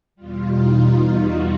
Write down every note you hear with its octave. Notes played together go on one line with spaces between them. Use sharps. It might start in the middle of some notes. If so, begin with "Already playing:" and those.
E2 B2 G3 F4
D#4
F4
F#4